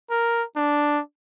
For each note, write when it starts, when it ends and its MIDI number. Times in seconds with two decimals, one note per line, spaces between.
0.10 0.44 70
0.56 1.00 62